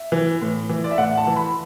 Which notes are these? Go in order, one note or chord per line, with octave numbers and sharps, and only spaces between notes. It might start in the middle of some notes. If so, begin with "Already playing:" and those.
Already playing: E5
E3
A2
E3
D5
E5
A2 F#5
A5
E3
B5